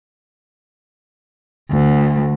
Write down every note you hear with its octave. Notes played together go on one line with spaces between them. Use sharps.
D2